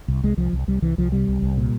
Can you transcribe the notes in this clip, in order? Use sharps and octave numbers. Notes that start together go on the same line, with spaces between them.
C2
C2 G#3
C2 F3
C2
C2 G3
C2 E3
C2 F3
C3 G3
C2
C2
A#2